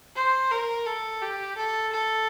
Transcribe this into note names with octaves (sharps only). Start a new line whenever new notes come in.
C5
A#4
A4
G4
A4
A4